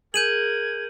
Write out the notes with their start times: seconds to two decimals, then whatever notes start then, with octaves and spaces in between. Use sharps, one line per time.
0.14 G#4 A#4 G6 G#6 D#7 F#7